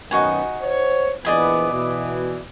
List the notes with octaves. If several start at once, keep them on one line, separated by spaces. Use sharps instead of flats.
F#2 D#3 B3 D#4 F#4 G#5
C5 C#5
A#1 E3 B3 D5 D#5 G#5
B2 E3